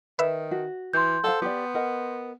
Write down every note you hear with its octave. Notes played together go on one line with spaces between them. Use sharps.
D#3 B4 E5
F#4
E3 C6 G6
A4 C5 F5 F#5
B3 G4 D5
A#4 D#5 F#5